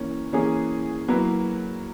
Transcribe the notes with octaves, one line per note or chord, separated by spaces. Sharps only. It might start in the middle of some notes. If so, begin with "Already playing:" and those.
Already playing: E3 A#3 C#4
E3 A#3 C#4 G#4
F#3 A#3 E4 B4